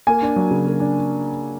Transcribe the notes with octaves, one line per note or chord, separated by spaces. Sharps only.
A#3 G#5
D4
F#3
C#3
A#3
D4